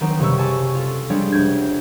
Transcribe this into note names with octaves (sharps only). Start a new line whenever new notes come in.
D#3 F#3 B3 C4 D#4
F#1 C3 G3 C#6 E6
G#5 A5 C#6 D6
F4 A4
G3 G#3 C4 D4 F4 C#5
F1 D4 G6 G#6